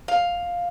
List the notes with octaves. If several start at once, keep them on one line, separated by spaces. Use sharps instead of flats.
F5